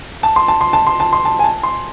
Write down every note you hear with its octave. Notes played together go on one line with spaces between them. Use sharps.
A5
C6
A5
C6
A5
C6
A5
C6
A5
G#5
A5
C6